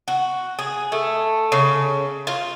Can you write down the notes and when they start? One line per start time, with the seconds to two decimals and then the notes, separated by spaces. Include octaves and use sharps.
0.08 F#4
0.59 G#4
0.92 A3
1.52 C#3
2.27 F4